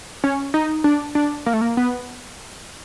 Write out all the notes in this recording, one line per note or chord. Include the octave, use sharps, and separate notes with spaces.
C#4
D#4
D4
D4
A#3
A3
A#3
B3